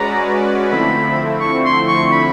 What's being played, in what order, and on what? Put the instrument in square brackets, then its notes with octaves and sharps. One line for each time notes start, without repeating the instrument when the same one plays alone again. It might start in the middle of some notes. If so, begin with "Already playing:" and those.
Already playing: [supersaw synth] G#3 C#4 F#4 B4 D5 [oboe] A#5
[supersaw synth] D3 F3 A3 C4 E4 [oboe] B5
[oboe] C#6
C6
C#6
B5